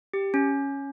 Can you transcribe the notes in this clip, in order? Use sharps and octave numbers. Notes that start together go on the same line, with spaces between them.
G4
C#4